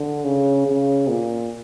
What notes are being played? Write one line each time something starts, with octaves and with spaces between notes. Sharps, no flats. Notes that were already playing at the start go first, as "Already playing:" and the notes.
Already playing: D3
C#3
C#3
A#2